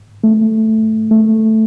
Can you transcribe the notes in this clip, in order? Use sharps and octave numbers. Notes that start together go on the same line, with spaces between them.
A3
A3